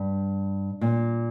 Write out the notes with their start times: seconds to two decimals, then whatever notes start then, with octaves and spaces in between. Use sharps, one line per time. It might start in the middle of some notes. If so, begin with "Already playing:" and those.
Already playing: G2
0.81 A#2